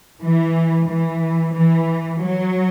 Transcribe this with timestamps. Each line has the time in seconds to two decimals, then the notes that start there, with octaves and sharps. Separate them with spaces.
0.22 E3
0.89 E3
1.56 E3
2.22 F#3